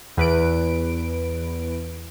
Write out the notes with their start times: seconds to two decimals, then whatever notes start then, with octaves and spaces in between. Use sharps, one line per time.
0.17 E2 B4 D7